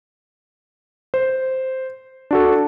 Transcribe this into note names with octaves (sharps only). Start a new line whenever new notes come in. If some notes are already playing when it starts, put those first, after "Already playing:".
C5
D4 F#4 A4